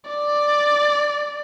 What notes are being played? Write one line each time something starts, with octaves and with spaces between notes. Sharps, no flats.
D5